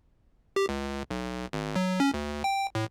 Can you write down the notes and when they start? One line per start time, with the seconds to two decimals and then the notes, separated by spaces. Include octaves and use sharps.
0.56 G4
0.69 C#2
1.11 B1
1.53 G#1
1.76 F#3
2.00 C#4
2.14 D2
2.44 G5
2.75 A2